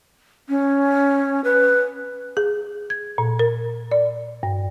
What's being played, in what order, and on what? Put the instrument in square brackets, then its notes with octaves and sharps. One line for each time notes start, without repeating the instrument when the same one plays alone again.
[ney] C#4
B4
[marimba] G#4
G#6
A#2
A#4
D5
G2